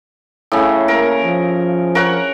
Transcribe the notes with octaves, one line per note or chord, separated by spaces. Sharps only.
A2 C#3
A#3 A#4
F3
A#4 C#5 F#5